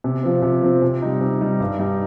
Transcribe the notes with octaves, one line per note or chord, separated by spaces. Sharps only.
C3
F3 C4
C3
F3 C4
C3
G3 D#4
C3
G3 D#4
G2
G3 D#4